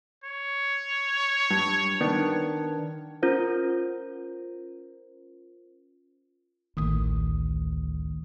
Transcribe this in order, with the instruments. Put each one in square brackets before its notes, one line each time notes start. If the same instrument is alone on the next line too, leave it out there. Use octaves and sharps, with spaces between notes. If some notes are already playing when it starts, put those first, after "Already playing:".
[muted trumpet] C#5
[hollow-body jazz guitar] G2
D#3 B3 D4
[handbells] C#4 F4 A#4 C5
[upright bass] A1 D2 [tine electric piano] D#3 D#6